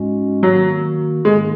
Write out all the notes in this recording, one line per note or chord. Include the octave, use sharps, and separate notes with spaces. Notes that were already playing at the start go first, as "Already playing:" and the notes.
Already playing: G#2 G#3 C#4 F#4
D#3 F#3 A#3 F#4
G#2 D#3 G#3 A#3